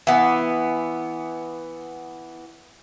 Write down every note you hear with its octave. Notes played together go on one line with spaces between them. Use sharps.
E3 B3